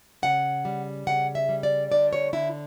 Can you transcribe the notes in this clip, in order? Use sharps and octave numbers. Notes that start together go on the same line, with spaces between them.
C#3 F#5
G3
C#3 F#5
E5
G3
D5
D3 D5
C#5
D3 E4